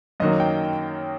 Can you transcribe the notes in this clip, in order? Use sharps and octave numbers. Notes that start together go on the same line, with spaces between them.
F#2 D#3 F#3 A#3 D#5
G5